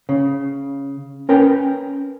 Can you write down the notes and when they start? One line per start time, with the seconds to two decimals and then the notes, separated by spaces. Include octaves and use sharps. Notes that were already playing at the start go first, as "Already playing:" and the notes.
0.09 C#3
1.29 C#4 A#4 B4 G5